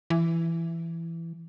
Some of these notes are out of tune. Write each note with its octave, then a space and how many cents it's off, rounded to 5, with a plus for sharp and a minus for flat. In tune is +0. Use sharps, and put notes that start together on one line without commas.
E3 +15